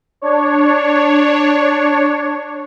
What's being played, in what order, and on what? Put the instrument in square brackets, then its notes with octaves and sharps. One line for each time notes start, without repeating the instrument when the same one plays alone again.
[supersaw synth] D4 C#5